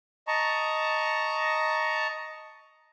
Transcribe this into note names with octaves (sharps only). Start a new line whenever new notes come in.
D#5 A5 A#5 C#6